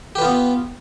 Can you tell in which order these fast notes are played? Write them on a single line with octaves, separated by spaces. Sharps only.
G4 B4 F4 B3